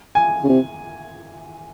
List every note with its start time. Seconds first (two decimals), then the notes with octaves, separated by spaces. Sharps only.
0.15 G#5
0.44 C#3
0.49 C3